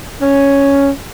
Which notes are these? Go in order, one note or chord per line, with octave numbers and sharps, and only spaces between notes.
C#4